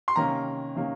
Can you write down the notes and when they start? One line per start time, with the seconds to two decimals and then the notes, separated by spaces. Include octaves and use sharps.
0.08 C6
0.16 C3 D#3 A#3 C#4 A#5
0.75 C3 D#3 A#3 C#4